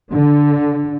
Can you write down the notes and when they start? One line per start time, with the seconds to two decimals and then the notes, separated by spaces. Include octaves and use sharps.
0.12 D3